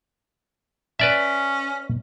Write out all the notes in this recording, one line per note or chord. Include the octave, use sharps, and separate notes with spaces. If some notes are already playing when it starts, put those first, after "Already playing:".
C#4 B4 D5 E5